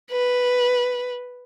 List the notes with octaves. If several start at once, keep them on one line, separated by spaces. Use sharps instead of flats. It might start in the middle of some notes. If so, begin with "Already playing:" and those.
B4